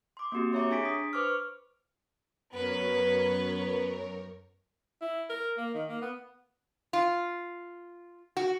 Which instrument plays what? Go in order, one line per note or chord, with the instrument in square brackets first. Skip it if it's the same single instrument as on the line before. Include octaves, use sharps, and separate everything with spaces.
[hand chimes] C6 D6
A#3 C4 F#4 G4
G4 C#5 E5 A#5 C#6 D6
D4 G#4 G#5 A6 B6 D7
D#6
B4 C5 C#6 D6 F6
[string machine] F#2 A#4 C#5 [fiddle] B3 B4
[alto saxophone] E4
A#4
A#3
D#3
A#3
B3
[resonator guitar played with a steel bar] F4
F#4